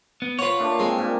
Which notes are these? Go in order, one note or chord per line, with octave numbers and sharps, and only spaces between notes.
B3
F4 B4 C#5 F#5
A#2 A3 D4
G#3 C4
G2 A#2